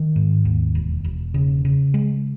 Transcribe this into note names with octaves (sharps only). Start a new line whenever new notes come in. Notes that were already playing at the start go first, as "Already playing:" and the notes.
Already playing: D#3
G#2
D#2
E1
E1
C#3
C#3
G#3